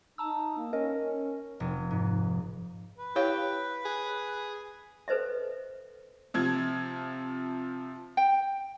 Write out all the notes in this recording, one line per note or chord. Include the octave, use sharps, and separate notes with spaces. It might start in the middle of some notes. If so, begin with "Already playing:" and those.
D#4 A5 A#5 E6
A#3
C#4 A#4 D#5
C#4
F1
G#2
B4
E4 G4 C#5 F5
G#4
A4 B4 C5 D#5 E5
C3 F3 G#6
G5